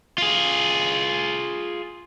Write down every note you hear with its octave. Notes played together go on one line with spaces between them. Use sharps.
F4 G#4